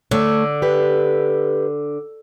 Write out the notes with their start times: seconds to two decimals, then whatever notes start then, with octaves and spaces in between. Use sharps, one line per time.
0.11 D3 A3 C#5
0.62 G4 B4